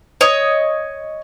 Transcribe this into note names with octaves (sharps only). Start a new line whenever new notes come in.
C#5 D#5